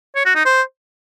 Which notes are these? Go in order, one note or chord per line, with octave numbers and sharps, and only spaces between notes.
C#5
F#4
D#4
C5